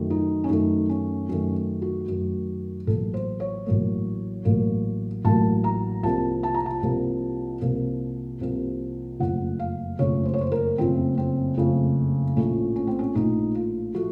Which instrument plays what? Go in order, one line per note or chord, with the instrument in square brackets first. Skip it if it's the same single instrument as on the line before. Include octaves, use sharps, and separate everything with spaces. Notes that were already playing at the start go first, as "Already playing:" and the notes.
Already playing: [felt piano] F#2 D#3 A3
D#4
C#4
F#2 D#3 A3 D#4
C#4
F#2 D#3 A3 C#4
F#4
F#2 D#3 A3
A1 A2 F#3 A#3 A4
C5
C#5
A1 A2 F#3 A#3
A1 A2 F#3 A#3
A1 A2 F#3 A#3 A5
A#5
C2 C3 F3 A#3 A5
A5
A#5
A5
C2 C3 F3 A#3
C2 C3 F3 A#3
C2 C3 F3 A#3
F#1 F2 C#3 A3 F#5
F5
F#1 F2 C#3 A3 C#5
C5
C#5
C5
A#4
F#1 F2 C#3 A3 C4
C4
F#1 F2 C#3 A3
A#1 A2 F3 A3 C#4
C#4
C4
C#4
A#1 A2 F3 A3 D#4
F4
A2 F3 A3 F#4